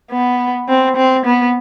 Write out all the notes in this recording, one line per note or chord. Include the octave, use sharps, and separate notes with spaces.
B3
C4
C4
B3